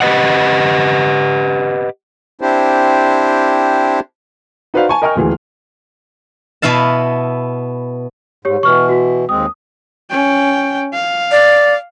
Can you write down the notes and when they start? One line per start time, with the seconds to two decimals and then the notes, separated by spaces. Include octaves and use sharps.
0.01 G4 B4 D#5 F#5
2.41 C4 D4 E4 G4 C5
4.74 D#4 F#4 B4 C5 D5 F5
4.89 G#5 A5 C#6
5.02 A#4 D#5 G5 G#5 C#6 F6
5.16 D#1 D2 E3 G#4
6.62 B2 B3 E4 F5 A5
8.45 G#2 G4 C#5
8.63 B2 E3 C#6 F6
8.89 F#4 B6
9.29 D#2 G#3 C4 D#6
10.11 C#4 G5
10.93 F5
11.31 D5